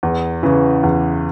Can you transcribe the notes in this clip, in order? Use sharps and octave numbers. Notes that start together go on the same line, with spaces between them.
E2
C#3 E3
E2